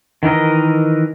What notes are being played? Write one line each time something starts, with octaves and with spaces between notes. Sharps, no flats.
D#3 E3 A#4 D#5